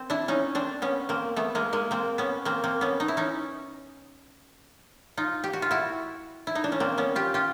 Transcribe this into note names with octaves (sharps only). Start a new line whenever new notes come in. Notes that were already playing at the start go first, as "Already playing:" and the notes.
Already playing: C4
D4 E4
C#4 D#4
C4 D4
B3 C#4
A#3 C4
A3 B3
G#3 A#3
G#3 A#3
A#3 C4
B3 C#4
A#3 C4
A#3 C4
B3 C#4
D#4
E4
C#4 D#4
D#4 F4
G4
F#4
F4
E4 F#4
E4
D#4
D4
C#4
A#3 C4
B3 C#4
F4 G4
F4 G4